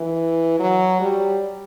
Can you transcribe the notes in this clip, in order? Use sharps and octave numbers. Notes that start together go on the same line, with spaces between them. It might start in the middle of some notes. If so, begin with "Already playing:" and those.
Already playing: E3
F#3
G3